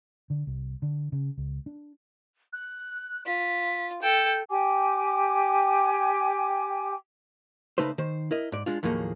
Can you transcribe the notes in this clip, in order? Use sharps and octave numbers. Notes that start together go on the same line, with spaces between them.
D3
C2
D3
C#3
C#2
D4
F#6
F4 B6
A4 G5 G6
G4 G5 G#5 D6
C#3 A3 D#4 B4 C5
D#3 C5
E4 A#4 D#5
G#2 D5
G#3 D4 F4
D#2 A2 F3 F#3 A#3 G#4